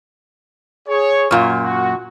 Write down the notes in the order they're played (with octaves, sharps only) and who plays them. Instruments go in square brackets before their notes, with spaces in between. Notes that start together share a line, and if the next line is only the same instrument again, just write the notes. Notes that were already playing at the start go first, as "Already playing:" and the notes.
[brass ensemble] G#4 C#5
[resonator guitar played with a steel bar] F#2 A#2 [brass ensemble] F4 F#4 C#5
[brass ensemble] F#4